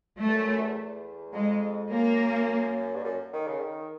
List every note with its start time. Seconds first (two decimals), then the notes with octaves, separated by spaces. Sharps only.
0.18 A3
0.28 G2
0.33 F#2
0.47 F#2
0.62 E2
0.82 E2
1.33 F2 G#3
1.90 F#2 A#3
2.95 G2
3.04 F#2
3.33 D#3
3.47 C#3
3.61 D#3